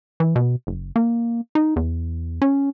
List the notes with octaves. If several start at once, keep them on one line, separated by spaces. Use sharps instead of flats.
E3
B2
F#1
A#3
D#4
E2
C#4